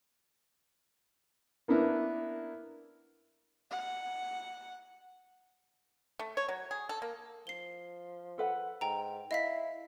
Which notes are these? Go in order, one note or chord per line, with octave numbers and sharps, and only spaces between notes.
A#3 B3 D4 E4 A#4
F#5
A3
C#5
F#3
G#4
A4
A#3
F3 C7 G7
A4 B4 F#5
G#2 G5 A#5
E4 D#5 F5 B6